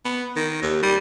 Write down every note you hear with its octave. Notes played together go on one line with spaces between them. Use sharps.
B3
D#3
D#2
G3